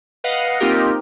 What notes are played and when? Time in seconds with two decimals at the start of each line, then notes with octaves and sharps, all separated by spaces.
0.24 B4 D#5 F5 F#5
0.60 A#3 C4 D#4 F4 G4 A#4